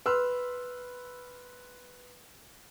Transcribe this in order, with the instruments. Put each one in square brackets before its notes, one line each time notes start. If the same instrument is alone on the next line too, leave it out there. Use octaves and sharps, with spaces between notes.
[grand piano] B4 C6 E6 F6